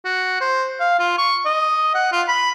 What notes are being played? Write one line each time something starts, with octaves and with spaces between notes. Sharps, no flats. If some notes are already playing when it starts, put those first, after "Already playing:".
F#4
C5
F5
F4
C#6
D#5
F#5
F4
B5